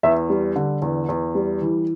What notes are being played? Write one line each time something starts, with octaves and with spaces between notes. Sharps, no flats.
E2 E5
G3
D3
E2
E2
G3
E3